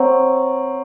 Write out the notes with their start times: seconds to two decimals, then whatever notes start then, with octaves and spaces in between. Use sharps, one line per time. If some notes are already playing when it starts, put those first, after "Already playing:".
Already playing: C4 C#5 F#5 A#5 C#6